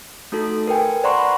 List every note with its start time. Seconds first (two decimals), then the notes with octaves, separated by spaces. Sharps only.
0.32 A3 D#4 F#4 A4
0.68 A#4 B4 G5 G#5
1.04 C5 D5 F#5 A#5 C6 C#6
1.18 A#5 B5